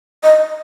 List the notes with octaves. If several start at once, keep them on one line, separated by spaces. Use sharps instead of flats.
D#5